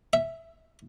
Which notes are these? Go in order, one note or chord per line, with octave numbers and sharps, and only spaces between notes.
E5